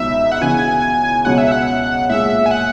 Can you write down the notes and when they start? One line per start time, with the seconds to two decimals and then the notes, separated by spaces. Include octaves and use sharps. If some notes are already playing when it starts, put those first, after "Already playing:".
Already playing: C#2 B2 F#3 B3 D#4 E5
0.32 F#5
0.41 C#3 E3 B3 F#4 G#5
1.25 C#2 B2 F#3 C#4 F#5
1.38 E5
1.52 F#5
2.10 A#2 G#3 C#4 G#4 E5
2.30 E5
2.46 G#5
2.51 F#5